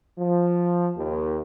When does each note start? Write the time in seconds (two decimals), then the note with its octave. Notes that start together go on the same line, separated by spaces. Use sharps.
0.19 F3
0.97 D#2